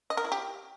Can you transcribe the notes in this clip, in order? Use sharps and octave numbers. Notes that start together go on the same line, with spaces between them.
D#5
A#4
E4
G4